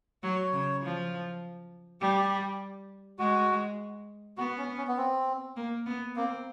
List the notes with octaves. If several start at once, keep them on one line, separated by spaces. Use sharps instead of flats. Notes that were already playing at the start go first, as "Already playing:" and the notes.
F#3 C#5
C#3
F3
G3 G4
G#3 F#4
B3 F#4
C#4
C#4
B3
C4
A#3
B3
A#3 C4